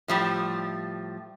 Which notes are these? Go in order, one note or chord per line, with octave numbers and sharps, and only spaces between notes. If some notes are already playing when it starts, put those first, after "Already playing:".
A2 F3 G3